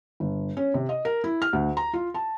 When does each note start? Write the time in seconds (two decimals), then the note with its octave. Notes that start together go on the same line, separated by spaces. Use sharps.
0.20 G1
0.57 C#4
0.74 C3
0.89 D#5
1.05 A#4
1.24 E4
1.42 F6
1.53 D2
1.77 A#5
1.93 F4
2.14 A5